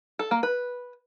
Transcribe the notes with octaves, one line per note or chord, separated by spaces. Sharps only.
A4
A#3
B4